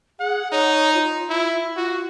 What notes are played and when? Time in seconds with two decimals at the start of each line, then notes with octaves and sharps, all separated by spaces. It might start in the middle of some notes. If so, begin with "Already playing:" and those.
0.20 G#4 F#5
0.52 D#4 C#5
0.94 F4
1.29 E4
1.77 F4 F#4